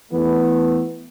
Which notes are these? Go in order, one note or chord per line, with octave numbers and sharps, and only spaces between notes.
E3 A3 B3